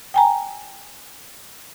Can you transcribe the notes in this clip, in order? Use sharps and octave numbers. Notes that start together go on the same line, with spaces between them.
G5 G#5 A#5